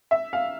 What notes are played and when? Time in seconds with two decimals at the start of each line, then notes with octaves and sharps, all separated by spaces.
0.11 E5
0.33 F5